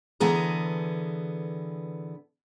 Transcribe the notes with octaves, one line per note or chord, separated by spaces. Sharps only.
D3 E3 B3 G#4 A#5